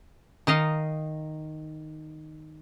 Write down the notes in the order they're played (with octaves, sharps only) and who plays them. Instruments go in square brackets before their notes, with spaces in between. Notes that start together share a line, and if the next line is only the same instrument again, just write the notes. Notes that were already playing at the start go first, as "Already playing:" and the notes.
[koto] D#3 D#4 D#5 F5